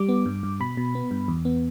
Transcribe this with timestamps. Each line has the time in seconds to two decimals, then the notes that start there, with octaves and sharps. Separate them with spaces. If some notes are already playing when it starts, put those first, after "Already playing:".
Already playing: G3 D6
0.09 B3
0.26 G2
0.43 G2
0.60 B2 B5
0.77 B2
0.95 B3
1.11 G2
1.28 E2
1.45 B3